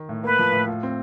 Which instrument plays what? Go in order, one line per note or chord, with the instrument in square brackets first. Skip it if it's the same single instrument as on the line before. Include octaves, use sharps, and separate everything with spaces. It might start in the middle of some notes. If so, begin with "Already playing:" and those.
Already playing: [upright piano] D#3
A2
[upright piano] A#3 [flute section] B4
[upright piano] F3
A2
F4
C4